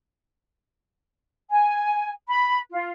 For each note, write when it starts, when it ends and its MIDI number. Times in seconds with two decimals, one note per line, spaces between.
1.51 2.11 80
2.29 2.59 83
2.71 2.91 65